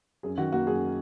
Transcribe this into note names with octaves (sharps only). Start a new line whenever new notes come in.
F#2 G#4
D#3 F#4
A#3 F#4
F#2 G#4